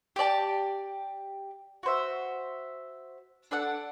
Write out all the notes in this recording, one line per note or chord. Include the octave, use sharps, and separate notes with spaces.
G4 D5 A5
F#4 C5 E5
D4 A4 D5 F#5